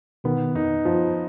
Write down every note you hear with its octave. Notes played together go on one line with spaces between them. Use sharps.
B2 D#3 B3
F2 D#4
F#2 F3